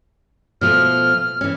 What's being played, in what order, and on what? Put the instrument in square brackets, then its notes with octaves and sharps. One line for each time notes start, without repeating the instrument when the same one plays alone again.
[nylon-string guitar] B2 F3 A3 [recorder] F6
[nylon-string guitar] E3 C#4